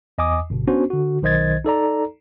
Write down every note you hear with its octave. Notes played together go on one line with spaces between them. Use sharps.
E2 D#5 G#5 D6 D#6
G1 B2
B3 C#4 D4 F#4 C5
D3 F#4
B1 D#3 C5 D#5 G#6 A6
D#4 A4 D5 A#5